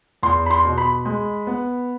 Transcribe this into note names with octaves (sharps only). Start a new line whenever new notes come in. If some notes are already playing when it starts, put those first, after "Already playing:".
E2 C6
B5
C6
B2
B5
G#3
B3